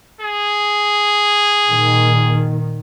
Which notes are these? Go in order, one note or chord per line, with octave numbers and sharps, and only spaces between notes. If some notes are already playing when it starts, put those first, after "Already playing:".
G#4
A#2 D#3